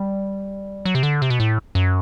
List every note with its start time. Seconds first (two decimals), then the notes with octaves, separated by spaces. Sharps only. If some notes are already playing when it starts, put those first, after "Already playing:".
Already playing: G3
0.85 F#3
0.95 C3
1.03 D3
1.22 C3
1.30 B2
1.40 A2
1.75 F#2